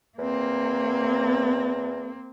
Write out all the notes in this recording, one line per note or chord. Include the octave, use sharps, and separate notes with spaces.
E2 A#3 C4